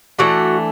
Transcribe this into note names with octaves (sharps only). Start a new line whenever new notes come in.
E3 A3 D4 F#4 F#5